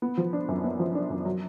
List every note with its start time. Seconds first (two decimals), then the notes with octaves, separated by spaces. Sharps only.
0.02 B3
0.17 F3
0.33 D4
0.49 F#2
0.64 B3
0.79 F3
0.95 D4
1.10 F#2
1.25 F#3